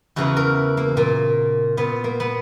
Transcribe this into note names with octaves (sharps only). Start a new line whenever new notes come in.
E2 C#3 E3 F#4
A#4
A#3
A#2 A#3
A#2 B3
A#3
B3